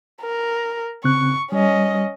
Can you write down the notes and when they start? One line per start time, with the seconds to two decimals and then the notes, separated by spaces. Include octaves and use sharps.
0.22 A#4
1.04 C#3 C4 C#6 F#6
1.52 G3 C#4 D#5